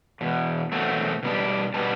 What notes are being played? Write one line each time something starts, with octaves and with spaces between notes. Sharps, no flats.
E2 B2
E2 B2 F#3 A3 C4
B2 G3 B3 D4
B2 G3 B3 D4 A5